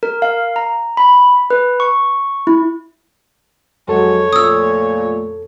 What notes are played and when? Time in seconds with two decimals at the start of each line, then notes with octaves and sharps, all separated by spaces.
0.03 A#4
0.22 F5
0.56 A#5
0.97 B5
1.50 B4
1.80 C#6
2.47 E4
3.88 F2 F#3 G#3 F#4 A4 C#5
4.33 A#2 F3 A3 D#6 E6